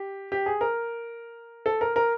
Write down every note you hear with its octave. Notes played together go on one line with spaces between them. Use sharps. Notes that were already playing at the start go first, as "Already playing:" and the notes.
Already playing: G4
G4
G#4
A#4
A4
A#4
A#4